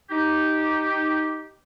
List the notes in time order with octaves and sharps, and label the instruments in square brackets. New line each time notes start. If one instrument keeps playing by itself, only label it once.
[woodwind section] D#4 G4